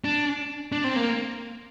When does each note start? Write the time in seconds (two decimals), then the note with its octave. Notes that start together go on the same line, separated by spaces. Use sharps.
0.04 D4
0.72 D4
0.84 C4
0.96 A#3